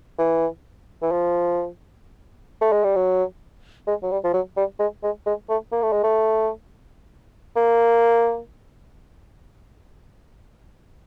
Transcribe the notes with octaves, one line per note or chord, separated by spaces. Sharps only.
E3
E3
F3
A3
G#3
G3
F#3
G#3
F#3
G3
F3
F#3
G3
G#3
G#3
G#3
A3
A#3
A3
G#3
A3
A#3